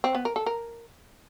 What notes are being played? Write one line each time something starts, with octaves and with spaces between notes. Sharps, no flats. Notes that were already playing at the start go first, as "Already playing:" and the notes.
C4
B3
A#4
A4
A#4